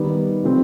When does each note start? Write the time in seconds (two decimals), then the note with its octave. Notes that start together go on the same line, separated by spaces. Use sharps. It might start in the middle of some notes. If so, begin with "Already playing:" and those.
Already playing: D#3 G3 B3 D#4
0.43 C3 F3 A3 C4